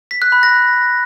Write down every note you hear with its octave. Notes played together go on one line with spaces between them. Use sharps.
B6
F#6
B5
A#6